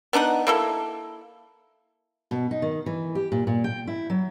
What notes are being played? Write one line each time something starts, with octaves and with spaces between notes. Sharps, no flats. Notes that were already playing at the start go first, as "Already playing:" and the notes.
B3 D4 D#4 F#5
A#3 E4 A4
B2
D#4
D#3
E3
G4
A#2
A#2
G5
E4
F#3